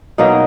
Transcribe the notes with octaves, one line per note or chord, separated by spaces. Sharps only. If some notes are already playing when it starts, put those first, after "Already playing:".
B2 F#3 A#3 D#4